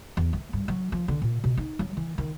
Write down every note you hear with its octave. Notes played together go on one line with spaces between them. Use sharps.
E2
A3
G2
F#3
F3
D3
A#2
B2
D#4
F#3
E3
D#3